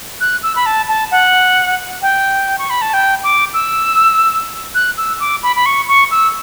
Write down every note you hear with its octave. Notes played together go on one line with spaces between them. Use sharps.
F#6
E6
B5
A5
A5
F#5
G5
C#6
B5
A5
G5
D6
E6
F#6
E6
D6
B5
B5
C#6
C#6
E6